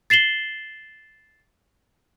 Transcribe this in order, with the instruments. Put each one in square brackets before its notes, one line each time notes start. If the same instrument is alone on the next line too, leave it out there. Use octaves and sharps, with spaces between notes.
[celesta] A6 C7 E7 F#7 G7